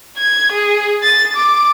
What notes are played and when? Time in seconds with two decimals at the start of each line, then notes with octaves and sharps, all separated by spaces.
0.17 G#6
0.53 G#4
1.03 A6
1.36 D6